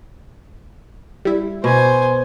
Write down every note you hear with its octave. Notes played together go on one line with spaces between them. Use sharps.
G3 E4
B2 C5 G#5